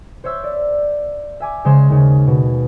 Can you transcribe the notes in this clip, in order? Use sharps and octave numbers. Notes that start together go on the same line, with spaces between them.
C5 C#5 E5 E6 G6
D5
E5 G#5 D6
C#3 G#3 C5 C6 E7
D#2 C#3
B2